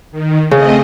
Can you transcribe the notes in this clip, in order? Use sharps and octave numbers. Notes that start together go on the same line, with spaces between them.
D#3
C#3 A3 C4 D#5